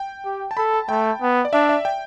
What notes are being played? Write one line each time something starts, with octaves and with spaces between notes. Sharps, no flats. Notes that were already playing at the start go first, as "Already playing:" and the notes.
Already playing: G5
G4
A5
A4 B5
A5
A3 G5
B3
D5
D4 E5
E5
G5